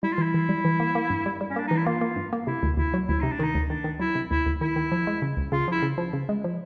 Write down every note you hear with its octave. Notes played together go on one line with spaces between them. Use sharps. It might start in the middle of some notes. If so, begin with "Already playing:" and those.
G3 E4
F4
E3 E4
E3
G3
E3
A#3
A#3
G2
G3
G3
C#4
A#3 D4
E3 D#4
E4
A#3 F4
A#3
G2
A#3
C3 E4
D2
D2 E4
F#3
D2 E4
C3 D#4
D4
D#3 D#4
D2
D#3 D4
D#3
F#3 E4
C3
D2 E4
D2
D#3 E4
D#3
F3
G#3
C#3
C#2
C#3 F4
F3 E4
C#3
F3
C#3
G#3
F3